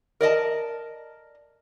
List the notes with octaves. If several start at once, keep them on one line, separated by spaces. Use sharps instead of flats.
A#4 D5 D#5 A5